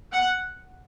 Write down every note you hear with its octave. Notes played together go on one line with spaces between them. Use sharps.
F#5